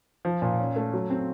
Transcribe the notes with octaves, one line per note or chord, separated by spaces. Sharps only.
F3
A#2
C#4
A3
F#3
C4